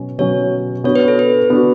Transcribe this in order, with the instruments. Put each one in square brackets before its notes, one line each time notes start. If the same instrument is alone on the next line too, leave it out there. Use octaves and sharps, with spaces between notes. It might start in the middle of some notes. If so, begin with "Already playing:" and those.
Already playing: [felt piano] B2 F#3 C#4
[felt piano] B2 F#3 C#4 [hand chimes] C#5
[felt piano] B3 D4 F#4 [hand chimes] C#5
[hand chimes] B4
A4
B4
[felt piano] B3 D4 F#4